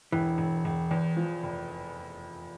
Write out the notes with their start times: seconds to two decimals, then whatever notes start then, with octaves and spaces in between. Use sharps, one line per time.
0.12 E1 E3
0.38 E1
0.65 E1
0.91 E2
1.17 F3
1.43 F1